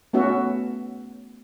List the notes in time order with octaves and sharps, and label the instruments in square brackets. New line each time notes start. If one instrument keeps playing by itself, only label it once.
[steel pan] A3 B3 C#4 F#4 E5